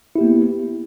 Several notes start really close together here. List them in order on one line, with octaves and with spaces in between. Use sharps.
E4 G4 A#3 B3